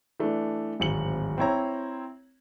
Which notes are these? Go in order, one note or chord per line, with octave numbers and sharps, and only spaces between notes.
E3 A3 D4
D1 G#1 C#7 F#7
C4 E4 C#5 A#5